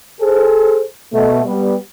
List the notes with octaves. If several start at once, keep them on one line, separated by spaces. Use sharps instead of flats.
G#4 A4 C5
B2 A3
G3 B3